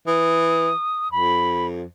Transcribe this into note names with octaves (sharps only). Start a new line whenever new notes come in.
E3 D#6
F2 B5